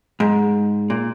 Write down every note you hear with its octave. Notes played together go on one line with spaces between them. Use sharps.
G#2
A#2